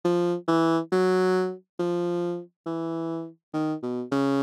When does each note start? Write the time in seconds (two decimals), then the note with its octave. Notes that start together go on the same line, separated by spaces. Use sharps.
0.04 F3
0.48 E3
0.92 F#3
1.79 F3
2.66 E3
3.54 D#3
3.83 B2
4.12 C#3